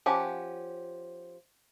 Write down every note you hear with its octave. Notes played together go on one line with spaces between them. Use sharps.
F3 C#4 G4 F#5